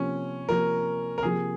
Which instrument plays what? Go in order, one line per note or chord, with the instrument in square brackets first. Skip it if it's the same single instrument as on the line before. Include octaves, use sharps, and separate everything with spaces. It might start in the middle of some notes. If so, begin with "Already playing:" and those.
Already playing: [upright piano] C3 F3 A#3 [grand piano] C#4
[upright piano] C3 F3 A#3 [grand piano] A#4
[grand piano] A#4
[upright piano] C3 F3 A#3 [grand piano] G#4